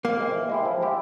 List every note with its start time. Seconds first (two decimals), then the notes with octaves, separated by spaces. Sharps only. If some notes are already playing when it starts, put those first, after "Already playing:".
0.04 A#2 A#3
0.19 G#3 C4
0.35 E3
0.49 G#3 E4 G4
0.65 F3
0.81 G#3 E4 G4